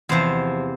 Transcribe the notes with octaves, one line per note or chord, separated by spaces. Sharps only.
E2 C3 F3 C5